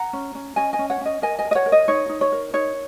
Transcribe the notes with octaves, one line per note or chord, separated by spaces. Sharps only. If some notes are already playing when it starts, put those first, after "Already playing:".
Already playing: F#5 A#5
C#4
C#4
C#4 D#5 G#5
D#5 G#5
C#4
C#5 F#5
C#4 D#5
A#4 D#5 G#5
D#5 G#5
A#4
D#5
C#5 F#5
A#4
D#5
D#4 C#5
D#4
C#5
A#4
D#4 C#5